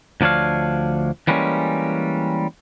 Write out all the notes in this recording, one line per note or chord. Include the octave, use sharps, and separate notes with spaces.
D2 F3 D4 C#5 F5
E3 G3 G#3 A#3 C#4